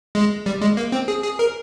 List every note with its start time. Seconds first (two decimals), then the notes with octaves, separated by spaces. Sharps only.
0.15 G#3
0.46 G3
0.61 G#3
0.77 A#3
0.92 C4
1.08 G#4
1.23 G#4
1.39 A#4